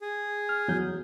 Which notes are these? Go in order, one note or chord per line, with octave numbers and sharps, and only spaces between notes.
G#4
F6
E2 F#3 G6